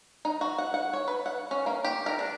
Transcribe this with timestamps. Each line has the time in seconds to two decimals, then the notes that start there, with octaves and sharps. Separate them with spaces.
0.25 D#4
0.41 F#4
0.58 F#5
0.74 F#5
0.93 C#5
1.08 B4
1.26 F#5
1.51 C#4
1.66 A#3
1.84 G4
2.06 A#4
2.19 D4